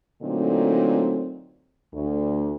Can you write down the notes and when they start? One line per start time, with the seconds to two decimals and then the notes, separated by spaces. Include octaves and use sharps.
0.23 A#2 D3 F#3 A3 C4 D#4
1.93 D2